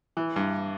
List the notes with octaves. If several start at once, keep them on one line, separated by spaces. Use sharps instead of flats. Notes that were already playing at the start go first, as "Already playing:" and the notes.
E3
G2